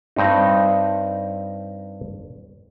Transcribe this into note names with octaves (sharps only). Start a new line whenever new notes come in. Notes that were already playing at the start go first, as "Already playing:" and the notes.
G2 C4 D#4